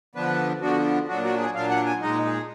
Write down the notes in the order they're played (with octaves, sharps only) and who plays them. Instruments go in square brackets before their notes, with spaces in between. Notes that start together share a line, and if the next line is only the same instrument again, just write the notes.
[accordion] D3 F3 B3 D4 B4
D3 F3 B3 D4 F#4
A#2 F#3 D4 F#4
F#4
G#4
A#2 F#3 D4 F5
F#5
G#5
A#2 G#3 D#4 D#5
G#4